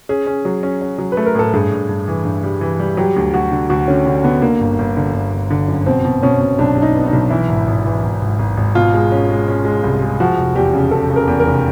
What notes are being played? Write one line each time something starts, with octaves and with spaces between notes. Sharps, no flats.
C#4 G#4
C#4
F#3
C#4
C#4
F#3
B4
A3
A#4
A2 A4
G2 G#4
G2
G2
E3
G2
G3
E3
G3
F#3 G4
D2
D2 F#4
D3
D2 F#4
D3 C#4
D3
D3 B3
D3 A#3
G1
G1
D3
G1
G1
D3
F#2
B2 C4
B2
B2 C#4
B2
B1 D4
B1
D#4
B3
D#4
B1
E3 E4
G#1
G#1
E3
G#1
G#1
G#1
G#1
B2 F4
G#3
C#4
G#3
C#4
G#3
C2
G#3
F3 F#4
F1
E2 G4
C#3
C#3 A4
C#3
A#4
E2
A#4
F1